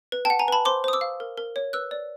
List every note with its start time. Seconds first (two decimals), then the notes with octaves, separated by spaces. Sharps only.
0.12 B4
0.25 G5 A5
0.30 F#5
0.39 G#5 A#5
0.48 B4 A5 B5
0.65 C5 C6 D6
0.84 C5 D#6
0.93 D6 E6
1.01 F5
1.20 A#4
1.37 A#4
1.56 C#5
1.73 B4 E6 F#6
1.91 D5